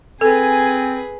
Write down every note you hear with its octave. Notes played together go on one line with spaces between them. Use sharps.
C4 G#4 A4 B4 G#5